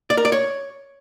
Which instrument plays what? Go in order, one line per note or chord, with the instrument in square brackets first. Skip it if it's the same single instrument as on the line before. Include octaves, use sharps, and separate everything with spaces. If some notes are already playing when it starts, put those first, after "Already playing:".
[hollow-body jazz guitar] D5
A#4
D5
C#5